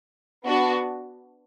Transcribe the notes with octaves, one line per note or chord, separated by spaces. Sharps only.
B3 D4 F#4